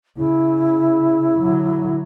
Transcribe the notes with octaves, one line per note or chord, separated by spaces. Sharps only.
C#3 E4
D3 F#3